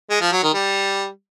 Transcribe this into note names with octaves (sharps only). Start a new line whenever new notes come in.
G#3
F3
F#3
D#3
G3